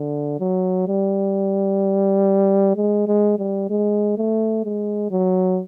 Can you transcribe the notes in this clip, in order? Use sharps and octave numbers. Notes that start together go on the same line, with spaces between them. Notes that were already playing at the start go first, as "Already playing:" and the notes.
Already playing: D3
F#3
G3
G#3
G#3
G3
G#3
A3
G#3
F#3